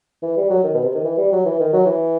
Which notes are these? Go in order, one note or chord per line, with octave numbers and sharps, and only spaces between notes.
E3
G3
F#3
D#3
B2
C3
D#3
E3
G3
F#3
E3
D#3
F#3
E3